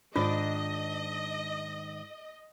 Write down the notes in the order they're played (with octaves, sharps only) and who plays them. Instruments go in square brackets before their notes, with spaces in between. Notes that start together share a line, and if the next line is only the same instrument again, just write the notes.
[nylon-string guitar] G#2 D#3 D5 [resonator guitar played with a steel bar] D4 [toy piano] F4 [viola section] D#5